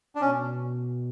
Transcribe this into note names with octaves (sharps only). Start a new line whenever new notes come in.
D4
B2 C#4